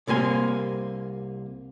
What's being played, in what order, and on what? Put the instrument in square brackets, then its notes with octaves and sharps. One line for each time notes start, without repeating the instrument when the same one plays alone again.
[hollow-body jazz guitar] C2 C3 A#3 G#5 C6